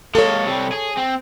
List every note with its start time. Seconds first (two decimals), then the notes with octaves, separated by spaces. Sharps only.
0.15 G#3 A#3 A4 C#5
0.45 C3 G3
0.72 G#4
0.97 C4